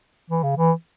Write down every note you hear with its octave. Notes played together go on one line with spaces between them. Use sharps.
E3
C#3
E3